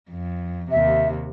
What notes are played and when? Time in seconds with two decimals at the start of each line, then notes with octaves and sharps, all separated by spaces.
0.10 F2
0.71 D#2 C3 E5